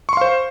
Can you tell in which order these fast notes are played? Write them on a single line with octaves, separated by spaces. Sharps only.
C#6 C6 F5 C5